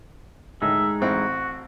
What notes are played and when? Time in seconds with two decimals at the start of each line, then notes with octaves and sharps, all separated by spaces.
0.62 A2 D#3 G#3 D#4 E5
1.01 A1 C4 E4 F#4